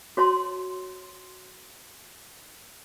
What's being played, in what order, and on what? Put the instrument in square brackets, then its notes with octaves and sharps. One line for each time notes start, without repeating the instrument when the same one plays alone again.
[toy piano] F#4 C#5 A5 C6